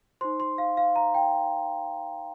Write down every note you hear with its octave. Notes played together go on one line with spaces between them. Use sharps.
D#4 C5 C6
C6
F5
F5
A#5
G5